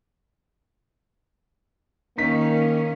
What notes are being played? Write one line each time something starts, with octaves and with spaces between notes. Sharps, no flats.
D#3 A#3 C#4 D#4 B6